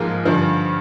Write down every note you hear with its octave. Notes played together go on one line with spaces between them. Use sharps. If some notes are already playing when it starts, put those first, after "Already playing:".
Already playing: G#2 F3 A#3 F4 G#4
G2 D3 F3